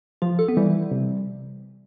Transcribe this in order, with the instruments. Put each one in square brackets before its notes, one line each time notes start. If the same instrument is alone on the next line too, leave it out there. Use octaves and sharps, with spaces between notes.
[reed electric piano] F3 [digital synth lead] F4
[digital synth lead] A4
B3
[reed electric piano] E3 [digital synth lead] G3
[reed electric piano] C3